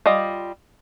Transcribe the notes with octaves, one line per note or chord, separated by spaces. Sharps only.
G3 F4 D#5